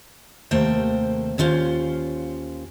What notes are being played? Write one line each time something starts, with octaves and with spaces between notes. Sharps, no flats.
D#2 C3 A3 A#3 C5 G5
D#2 C#4 F4 C5